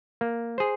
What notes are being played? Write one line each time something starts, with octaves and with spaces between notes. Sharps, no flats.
A#3
G#4 C5